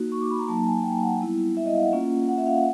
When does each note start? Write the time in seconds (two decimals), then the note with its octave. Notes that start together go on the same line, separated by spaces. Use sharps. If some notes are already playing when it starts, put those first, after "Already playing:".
Already playing: A#3 D#4 F#4
0.12 C#6
0.21 D6
0.31 B5
0.39 A#5
0.48 F#3 A#3 D#4 A5
0.67 G#5
0.84 G5
1.03 F#5
1.21 G3 B3 E4
1.57 E5
1.66 D#5
1.75 F5
1.83 F#5
1.93 A#3 C#4 F4
2.29 F#5
2.38 E5
2.46 F5
2.56 F#5